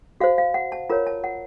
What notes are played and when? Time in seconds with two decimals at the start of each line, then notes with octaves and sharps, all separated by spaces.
0.20 F#4 C5 F5
0.38 F5
0.54 F#5
0.72 A5
0.90 F4 A#4 C#5 A#5
1.07 A5
1.24 F#5